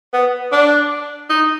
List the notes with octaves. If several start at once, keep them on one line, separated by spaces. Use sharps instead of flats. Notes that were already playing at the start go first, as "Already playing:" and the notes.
B3
D4
D#4